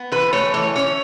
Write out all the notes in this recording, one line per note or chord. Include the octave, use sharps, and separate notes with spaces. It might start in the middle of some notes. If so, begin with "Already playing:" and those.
Already playing: B3
E3 B4
A3 C#5
E3 C#5
C#4 C#5